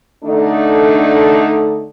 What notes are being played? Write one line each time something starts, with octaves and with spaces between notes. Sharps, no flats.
D3 A3 D4 D#4